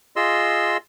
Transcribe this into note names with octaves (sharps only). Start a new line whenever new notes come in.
F4 G#4 D#5 C6 E6